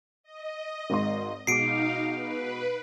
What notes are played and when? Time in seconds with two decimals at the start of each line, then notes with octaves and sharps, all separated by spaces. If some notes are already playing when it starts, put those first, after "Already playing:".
0.23 D#5
0.90 G#1 G#2 C6
1.47 B2 G#3 D#4 F5 D6 C7 D7
2.14 B4